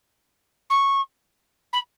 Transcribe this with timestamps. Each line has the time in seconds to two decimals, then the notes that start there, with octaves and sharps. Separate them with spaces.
0.70 C#6
1.73 B5